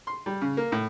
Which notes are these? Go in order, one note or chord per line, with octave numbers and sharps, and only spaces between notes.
C6
G3
C#3
A#3
A2